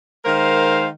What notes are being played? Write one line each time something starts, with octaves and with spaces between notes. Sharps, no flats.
D#3 G#3 A#4 C5 F5